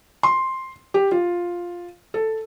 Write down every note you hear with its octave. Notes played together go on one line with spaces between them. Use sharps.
C6
G4
F4
A4